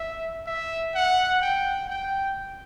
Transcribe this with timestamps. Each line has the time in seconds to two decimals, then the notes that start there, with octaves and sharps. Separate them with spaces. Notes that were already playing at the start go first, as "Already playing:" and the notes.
Already playing: E5
0.46 E5
0.94 F#5
1.41 G5
1.89 G5